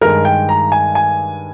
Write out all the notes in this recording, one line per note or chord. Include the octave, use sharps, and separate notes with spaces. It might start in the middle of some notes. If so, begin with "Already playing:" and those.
G2 D#3 G#3 A#4
G5
A#5
G#5
G#5